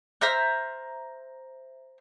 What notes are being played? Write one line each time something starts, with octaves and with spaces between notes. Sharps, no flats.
C5 E5 A#5 F6